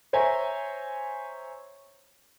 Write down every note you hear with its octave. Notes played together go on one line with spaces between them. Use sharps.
C5 C#5 E5 G#5 A#5